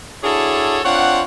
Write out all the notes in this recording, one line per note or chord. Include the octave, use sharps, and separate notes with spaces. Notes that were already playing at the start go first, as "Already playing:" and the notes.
D4 E4 F#4 G#4 A4 C#5
C4 D4 F4 C#5 F#5